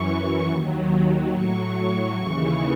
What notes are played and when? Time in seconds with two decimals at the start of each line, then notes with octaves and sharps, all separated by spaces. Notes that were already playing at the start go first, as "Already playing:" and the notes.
Already playing: F#2 E3 C#6
0.47 D#2 D#3 F#3
1.32 A2 F#3 C#6
2.16 D#2 C#3 E3 C#6